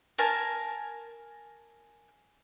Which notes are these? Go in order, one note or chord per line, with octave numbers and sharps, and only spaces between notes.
A#4 G#5 A5